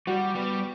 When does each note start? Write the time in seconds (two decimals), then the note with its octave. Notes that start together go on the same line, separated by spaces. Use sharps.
0.07 G3 F#4
0.34 G3 B3